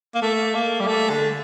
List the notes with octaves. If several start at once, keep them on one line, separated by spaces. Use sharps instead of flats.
A#3
A3
A#3
G3
A3
D3